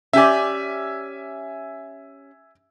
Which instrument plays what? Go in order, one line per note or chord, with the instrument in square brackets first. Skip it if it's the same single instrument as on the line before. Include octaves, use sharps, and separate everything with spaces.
[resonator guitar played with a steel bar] C#4 G4 D5 [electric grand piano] E5 G#5